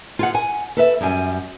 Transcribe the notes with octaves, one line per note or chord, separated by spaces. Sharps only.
F4 G#4 F#5
F#5 G#5
A4 B4 E5
F#2 G3 A4 G#5